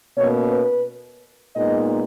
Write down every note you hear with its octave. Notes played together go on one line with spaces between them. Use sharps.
B2 A#3 C#4 C#5
B4
A#2 G#3 B3 D#4 D#5